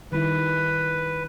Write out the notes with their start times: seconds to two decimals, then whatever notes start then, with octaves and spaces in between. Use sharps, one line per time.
0.12 D#3 G3 E4 B4